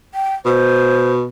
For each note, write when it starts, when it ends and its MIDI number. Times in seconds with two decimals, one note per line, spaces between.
0.14 0.35 79
0.46 1.26 47
0.46 1.11 72